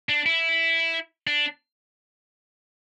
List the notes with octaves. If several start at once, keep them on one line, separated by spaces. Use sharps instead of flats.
D4
E4
D4